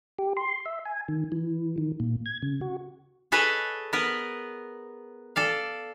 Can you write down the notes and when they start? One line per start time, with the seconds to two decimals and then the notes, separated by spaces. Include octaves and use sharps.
0.19 G4
0.37 C6
0.66 E5
0.85 G#5
1.08 D#3
1.32 E3
1.78 D#3
2.00 A#2
2.26 G#6
2.42 C#3
2.61 F#4
3.32 G#4 A4 B4 C#5 D#5 A5
3.93 B3 A#4 B4
5.36 A4 D5 F5